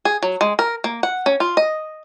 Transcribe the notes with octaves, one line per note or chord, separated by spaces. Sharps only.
G#4
F#3
G#3
A#4
A#3
F#5
C#4
F4
D#5